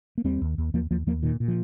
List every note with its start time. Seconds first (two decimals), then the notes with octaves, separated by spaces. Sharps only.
0.18 A#3
0.24 D#2 G3 C4
0.42 D#2
0.58 D#2
0.74 D#2 F3 A#3
0.91 D#2 F3 A#3
1.07 D#2 F3 A#3
1.23 A#2 D#3
1.40 A#2
1.48 F3